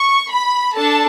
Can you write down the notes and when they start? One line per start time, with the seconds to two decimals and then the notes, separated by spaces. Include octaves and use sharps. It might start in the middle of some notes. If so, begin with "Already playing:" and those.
Already playing: C#6
0.31 B5
0.75 D4 A4 A5